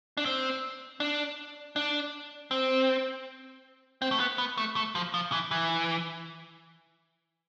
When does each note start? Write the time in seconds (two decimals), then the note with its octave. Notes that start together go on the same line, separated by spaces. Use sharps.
0.17 D4
0.25 C4
1.00 D4
1.76 D4
2.51 C4
4.02 C4
4.11 A3
4.20 B3
4.38 B3
4.58 A3
4.76 A3
4.95 F3
5.14 F3
5.32 E3
5.51 E3